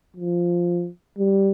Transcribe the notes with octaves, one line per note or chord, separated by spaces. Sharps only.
F3
G3